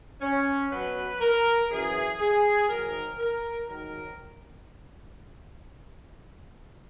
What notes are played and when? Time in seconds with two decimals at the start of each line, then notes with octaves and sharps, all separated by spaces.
0.21 C#4
0.71 B2 F#3 B4
1.21 A#4
1.70 F#2 E3 G#4
2.20 G#4
2.69 G#2 D#3 F#3 A#4
3.18 A#4
3.68 G#2 D#3 F#3 A#4